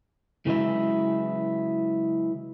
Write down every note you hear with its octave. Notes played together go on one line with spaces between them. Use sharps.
C#3 E3 F#3 G#3 E4